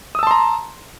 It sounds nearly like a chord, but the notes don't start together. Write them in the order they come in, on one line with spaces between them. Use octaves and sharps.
D#6 E6 A5 C6 A#5